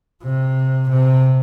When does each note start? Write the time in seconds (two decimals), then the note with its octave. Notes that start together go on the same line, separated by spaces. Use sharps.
0.23 C3
0.89 C3